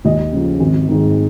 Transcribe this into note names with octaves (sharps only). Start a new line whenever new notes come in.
D#2 D#5
C#3 F3
G#1
G#2 D#3